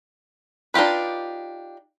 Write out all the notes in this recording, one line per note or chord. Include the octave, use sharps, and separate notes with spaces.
D4 D#4 F4 G4 B4